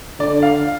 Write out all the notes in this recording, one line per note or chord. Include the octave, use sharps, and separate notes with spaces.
D3 D5
F5